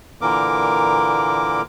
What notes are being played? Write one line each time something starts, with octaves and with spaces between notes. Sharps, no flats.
A#2 D3 E3 A#3 A#4 D6